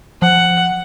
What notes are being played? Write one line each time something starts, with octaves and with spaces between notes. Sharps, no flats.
F3 F#5